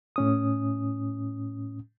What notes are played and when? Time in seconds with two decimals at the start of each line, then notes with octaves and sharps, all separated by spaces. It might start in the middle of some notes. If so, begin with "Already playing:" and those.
0.16 A2 C#4 D#6